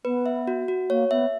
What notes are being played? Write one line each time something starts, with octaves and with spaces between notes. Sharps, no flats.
B3 B4
E5
F#4
F#4
A#3 C#5
B3 E5